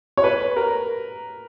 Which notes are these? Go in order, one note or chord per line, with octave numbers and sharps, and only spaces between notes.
C#5
B4
A#4